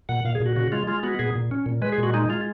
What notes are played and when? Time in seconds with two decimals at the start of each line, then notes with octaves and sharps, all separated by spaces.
0.09 A#2 F#5
0.25 A#2 F5
0.35 G#4
0.40 A#2
0.46 F#4
0.56 C#3 F#4
0.72 G#3 F4
0.88 G#3 F4
1.03 B3 F#4
1.19 A#2 G#4
1.35 A#2
1.51 C#4
1.66 A#2
1.82 G#3 B4
1.92 G#4
1.98 A#2
2.03 F#4
2.14 G#3 D#4
2.29 G#3 F4